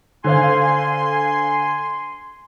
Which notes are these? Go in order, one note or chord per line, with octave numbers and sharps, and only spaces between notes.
D3 C5 F5 G#5 C6